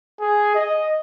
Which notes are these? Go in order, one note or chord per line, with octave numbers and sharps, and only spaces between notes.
G#4
D#5